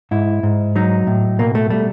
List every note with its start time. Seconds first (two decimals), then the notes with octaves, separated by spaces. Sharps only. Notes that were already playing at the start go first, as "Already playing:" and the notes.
0.11 G#2 E4
0.43 G#2
0.76 F#3 D#4
1.07 A2
1.39 B2 A#3
1.55 A3
1.70 G3 A3